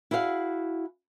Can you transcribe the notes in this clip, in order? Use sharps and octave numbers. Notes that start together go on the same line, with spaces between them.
E4 F#4 G#4 C5 F5 F#5